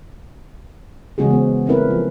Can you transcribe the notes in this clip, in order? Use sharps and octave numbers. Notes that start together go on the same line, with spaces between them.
C#3 E3 G#3 C#4 F#4 G#4
B3 C5
A3 C4 C#4 E4 A#4 B4
F3